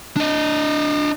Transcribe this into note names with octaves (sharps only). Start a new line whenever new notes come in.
D4 D#5